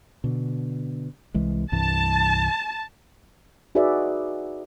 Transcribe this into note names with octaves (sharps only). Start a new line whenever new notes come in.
B2 D3
C2 E3 G#3
C2 G2 E3 A5
D#4 F#4 G#4 B4 D5 E5